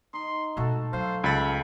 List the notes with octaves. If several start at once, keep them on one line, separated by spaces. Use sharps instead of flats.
D#4 C6
B2 G#3 A3 F#4 A4
F#3 C5 F5
C#2 A4 B5 A6